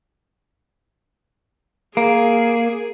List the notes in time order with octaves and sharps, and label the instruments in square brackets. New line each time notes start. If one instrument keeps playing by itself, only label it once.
[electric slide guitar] A#3 [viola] G#4